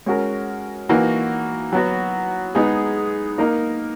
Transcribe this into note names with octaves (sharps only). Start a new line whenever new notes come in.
G#3 C#4 F#4 A#4
E3 A#3 D#4 F#4
F#3 B3 F#4
G#3 B3 D#4 G#4
A#3 D#4 A#4